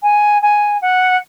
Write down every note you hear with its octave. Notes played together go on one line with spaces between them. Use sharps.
G#5
G#5
F#5